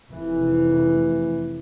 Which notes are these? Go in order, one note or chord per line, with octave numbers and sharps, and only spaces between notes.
F1 E3